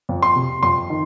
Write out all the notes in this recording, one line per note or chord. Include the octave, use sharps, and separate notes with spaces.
F2
C6
C3
F2 C6
D#3